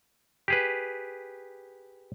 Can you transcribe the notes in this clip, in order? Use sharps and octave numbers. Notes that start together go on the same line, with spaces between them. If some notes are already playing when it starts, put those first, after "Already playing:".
G4 G#4 B4